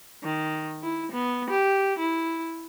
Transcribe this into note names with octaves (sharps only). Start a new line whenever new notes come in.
D#3
E4
B3
G4
E4